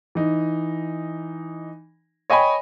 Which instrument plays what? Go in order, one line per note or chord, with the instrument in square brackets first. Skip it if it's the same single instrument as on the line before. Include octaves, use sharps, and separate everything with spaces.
[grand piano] E3 D#4
C#5 D#5 G5 G#5 B5